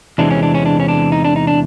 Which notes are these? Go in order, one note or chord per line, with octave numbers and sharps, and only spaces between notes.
E2 C3 E3 G#3 C4 D4
C#4
D4
C#4
D4
C#4
D4
D#4
D4
D#4
D4